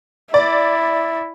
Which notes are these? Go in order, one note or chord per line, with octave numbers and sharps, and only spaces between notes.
E4 D5